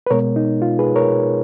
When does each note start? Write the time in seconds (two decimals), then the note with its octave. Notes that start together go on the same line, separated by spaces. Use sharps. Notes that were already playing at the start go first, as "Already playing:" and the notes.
0.07 B4
0.10 B2 G#3 B3 A#4 C#5
0.36 D#4
0.62 F4
0.79 G#4 B4
0.96 A#4 C#5